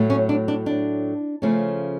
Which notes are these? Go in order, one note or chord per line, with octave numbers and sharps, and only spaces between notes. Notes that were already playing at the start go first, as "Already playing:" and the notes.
Already playing: A2 F#3 A3
C#4
D4
D4
D4
C#3 F3 A3 C#4